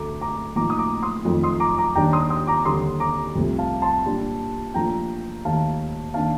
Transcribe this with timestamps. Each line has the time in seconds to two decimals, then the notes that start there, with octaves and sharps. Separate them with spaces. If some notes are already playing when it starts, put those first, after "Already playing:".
Already playing: D2 D3 A3 A#5 D6
0.21 A#5 D6
0.56 A2 F3 A#3 D#4 A#5 D6
0.70 D#6
0.79 A#5 D6
1.03 C6 D#6
1.25 F2 D#3 A3
1.44 C6 D#6
1.60 A#5 D6
1.78 A#5 D6
1.95 D#2 D#3 G3 D4 G5 A#5
2.13 C6 D#6
2.30 C6 D#6
2.47 A#5 D6
2.65 D#2 D3 G3 C6 D#6
3.00 A#5 D6
3.35 C2 C3 F3 A3
3.58 F5 A5
3.82 A5 C6
4.05 A#2 G3 D4
4.74 A#2 F3 A3 D4 G5 A#5
5.45 D#2 D#3 A3 F5 A5
6.14 D#3 A#3 D4 F5 A5